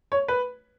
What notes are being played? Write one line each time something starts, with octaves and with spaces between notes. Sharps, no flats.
C#5
B4